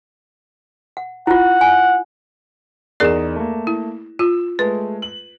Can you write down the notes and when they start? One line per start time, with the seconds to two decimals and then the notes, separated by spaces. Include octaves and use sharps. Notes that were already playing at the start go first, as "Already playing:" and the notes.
0.97 F#5
1.27 E4 F4 F#5
1.61 G#5
3.00 E2 D#4 G#4 A#4 D5 E7
3.36 A3 A#3
3.67 E4
4.19 F4 E6
4.59 G#3 A3 B4
5.02 F#7